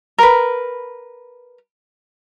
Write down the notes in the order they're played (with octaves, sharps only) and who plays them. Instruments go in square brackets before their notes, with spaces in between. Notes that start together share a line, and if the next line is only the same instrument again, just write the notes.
[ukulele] A#4 B4